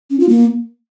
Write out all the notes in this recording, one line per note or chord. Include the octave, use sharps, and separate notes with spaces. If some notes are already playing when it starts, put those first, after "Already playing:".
C#4
F4
A#3